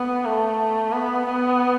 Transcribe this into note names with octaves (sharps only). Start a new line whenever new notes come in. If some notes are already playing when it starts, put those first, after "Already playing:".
Already playing: B3
A3
B3
B3